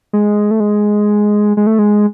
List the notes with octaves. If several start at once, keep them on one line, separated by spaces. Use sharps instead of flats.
G#3
A3
G#3
G#3
A3
G#3